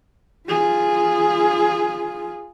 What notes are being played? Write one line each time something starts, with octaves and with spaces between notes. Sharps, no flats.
F4 G#4